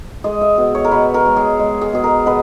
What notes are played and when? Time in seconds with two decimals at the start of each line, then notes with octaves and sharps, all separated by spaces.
0.24 G#3 D#5
0.41 E5
0.58 B2
0.75 C#5
0.85 A#4
0.91 B2 B4
1.14 A#4
1.26 G#3
1.36 G#4
1.59 G#3
1.81 G#4
1.93 B2 G#4
2.04 A#4
2.26 B2 B4